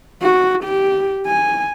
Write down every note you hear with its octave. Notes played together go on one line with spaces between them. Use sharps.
F#4
G4
G#5